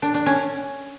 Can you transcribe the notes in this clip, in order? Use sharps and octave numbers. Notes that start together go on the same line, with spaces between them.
D4
D4
C#4